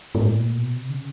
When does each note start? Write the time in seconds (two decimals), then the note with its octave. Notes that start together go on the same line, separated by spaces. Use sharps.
0.15 G#2
0.21 A2
0.39 A#2
0.57 B2
0.77 C3
0.89 D3
0.95 C#3